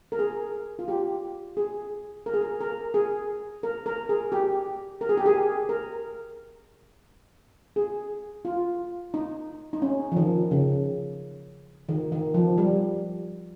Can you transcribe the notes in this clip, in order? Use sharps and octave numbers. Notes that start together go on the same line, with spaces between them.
A#4
G#4
F4
G4
G#4
A#4
G#4
A#4
A#4
G#4
A#4
A#4
G#4
G4
A#4
G#4
G4
G#4
A#4
G#4
F4
D#4
D#4
C#4
F3
D#3
C#3
D#3
D#3
F3
G3